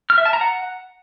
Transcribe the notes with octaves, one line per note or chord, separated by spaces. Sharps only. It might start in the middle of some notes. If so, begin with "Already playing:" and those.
F6
E5
A5
A#5
F#5